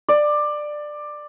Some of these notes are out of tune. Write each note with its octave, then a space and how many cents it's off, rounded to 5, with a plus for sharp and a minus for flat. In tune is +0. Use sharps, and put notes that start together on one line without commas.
D5 +15